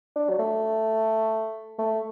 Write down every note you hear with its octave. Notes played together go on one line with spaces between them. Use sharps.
D4
F#3
A3
A3